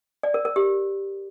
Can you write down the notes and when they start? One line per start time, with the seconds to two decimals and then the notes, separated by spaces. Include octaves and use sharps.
0.23 D5
0.34 A#4
0.45 A#4
0.56 G4